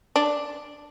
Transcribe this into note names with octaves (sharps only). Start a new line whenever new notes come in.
D4